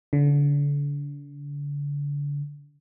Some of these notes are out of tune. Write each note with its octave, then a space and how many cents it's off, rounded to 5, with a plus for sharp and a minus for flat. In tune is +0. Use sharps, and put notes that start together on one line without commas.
D3 -35